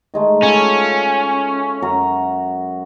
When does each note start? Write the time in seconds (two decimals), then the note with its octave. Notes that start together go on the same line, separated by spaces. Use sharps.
0.14 D#3 G#3 A3
0.43 C#4 F4 A4
1.82 F#2 F#4 A#5